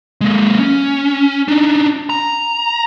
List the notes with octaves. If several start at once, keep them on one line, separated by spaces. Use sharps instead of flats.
G#3 A#3
C#4
D4 D#4
A#5